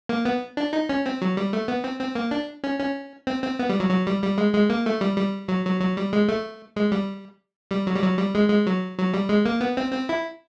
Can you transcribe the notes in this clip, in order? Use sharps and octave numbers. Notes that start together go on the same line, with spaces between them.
A#3
B3
D4
D#4
C#4
C4
F#3
G3
A3
B3
C4
C4
A#3
D4
C#4
C#4
C4
C4
B3
G3
F#3
F#3
G3
G3
G#3
G#3
A#3
A3
G3
G3
F#3
F#3
F#3
G3
G#3
A3
G#3
G3
G3
F#3
G3
F#3
G3
G#3
G#3
F#3
F#3
G3
G#3
A#3
B3
C4
C4
E4